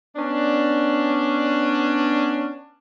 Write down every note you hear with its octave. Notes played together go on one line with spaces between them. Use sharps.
B3 C#4 D4